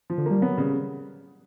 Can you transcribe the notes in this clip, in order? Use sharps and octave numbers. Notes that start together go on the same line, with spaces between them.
F3
D3
G3 A#3
F#3 B3
C#3 G3